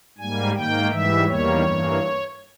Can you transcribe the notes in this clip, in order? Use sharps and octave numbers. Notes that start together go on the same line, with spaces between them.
G#2 G3 A#3 G#5
G#2 D#3 A#3 G5
G#2 E3 G3 E5
E2 D#3 G3 A#3 C#5
G2 E3 A#3